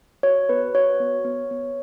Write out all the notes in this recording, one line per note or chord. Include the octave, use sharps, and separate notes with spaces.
F#4 C#5
B3 B4
F#4 C#5
B3
B3
B3